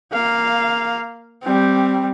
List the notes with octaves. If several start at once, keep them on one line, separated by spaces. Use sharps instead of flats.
A#3 F5
G3 C4